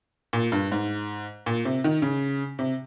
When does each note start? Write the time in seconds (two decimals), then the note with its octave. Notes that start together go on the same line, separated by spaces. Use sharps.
0.33 A#2
0.52 G2
0.72 G#2
1.46 A#2
1.65 C3
1.84 D#3
2.02 C#3
2.59 C3